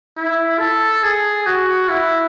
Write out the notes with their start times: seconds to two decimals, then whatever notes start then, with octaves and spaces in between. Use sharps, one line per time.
0.17 E4
0.59 A4
1.04 G#4
1.46 F#4
1.89 E4